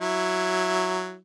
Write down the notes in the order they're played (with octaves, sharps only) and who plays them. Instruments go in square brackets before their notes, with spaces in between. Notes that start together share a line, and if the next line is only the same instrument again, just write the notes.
[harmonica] F#3 E4